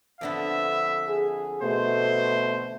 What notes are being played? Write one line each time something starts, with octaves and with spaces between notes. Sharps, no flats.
F2 D3 B3 E5
G#4
B2 A3 C5